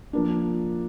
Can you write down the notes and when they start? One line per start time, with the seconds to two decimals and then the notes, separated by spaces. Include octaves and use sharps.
0.13 F3 A#3 D4